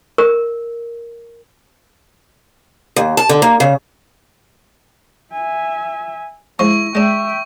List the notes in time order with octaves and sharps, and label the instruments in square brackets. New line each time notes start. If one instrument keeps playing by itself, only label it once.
[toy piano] A#4
[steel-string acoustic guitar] D#2
A5
D3
A#3
C#3
[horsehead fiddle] E5 G#5
[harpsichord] F3 G#3 [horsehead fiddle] E4 [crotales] C#6
[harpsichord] G#3 D4 [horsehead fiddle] E5 G5